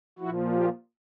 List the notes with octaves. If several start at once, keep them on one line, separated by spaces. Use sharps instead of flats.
A#2 F3 E4 F#4
F4 G4